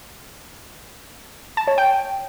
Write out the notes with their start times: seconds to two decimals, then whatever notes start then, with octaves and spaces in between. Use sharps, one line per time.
1.57 A5
1.68 C#5
1.78 G5